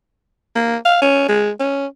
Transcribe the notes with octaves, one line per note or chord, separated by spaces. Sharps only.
A#3
F5
C#4
G#3
C#4